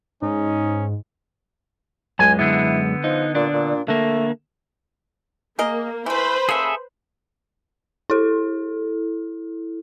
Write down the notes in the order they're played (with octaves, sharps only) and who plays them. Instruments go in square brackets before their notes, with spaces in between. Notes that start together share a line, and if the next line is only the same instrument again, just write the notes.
[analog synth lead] G#2 [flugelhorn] C#4 [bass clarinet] D#4
[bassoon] C#2 [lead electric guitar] F#2 G#3 [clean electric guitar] G#5
[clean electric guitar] D3 B3 [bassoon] E4
[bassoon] F3 [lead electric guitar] D#4
[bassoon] A#2 [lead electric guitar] D4
[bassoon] A#2
[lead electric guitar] D3 A#3 [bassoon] A3
[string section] A#3 [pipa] G#4 A#4 D#5
[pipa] E3 A3 [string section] B4 C5 B5
[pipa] A#3 C#4 [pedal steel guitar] G#4 A4 E5
[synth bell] E4 A4